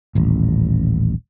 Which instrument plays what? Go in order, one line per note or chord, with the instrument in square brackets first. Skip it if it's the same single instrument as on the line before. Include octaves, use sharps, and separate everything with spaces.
[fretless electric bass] D#1 A1